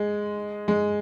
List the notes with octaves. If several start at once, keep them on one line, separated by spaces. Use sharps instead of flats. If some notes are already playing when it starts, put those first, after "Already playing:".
Already playing: G#3
G#3